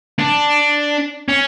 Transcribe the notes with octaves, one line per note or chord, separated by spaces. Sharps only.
D4
C#4